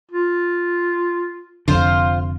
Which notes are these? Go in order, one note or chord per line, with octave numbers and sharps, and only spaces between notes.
F4
F1 F2 D3 F4 C5 F5